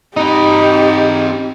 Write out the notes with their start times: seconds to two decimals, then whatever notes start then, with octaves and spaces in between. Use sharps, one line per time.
0.17 C4 D#4 G4 D#5